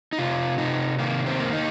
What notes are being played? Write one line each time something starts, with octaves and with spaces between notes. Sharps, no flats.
D#4
C3 F4
C3 D#4
D#3 A#3
C4
A#3
D#4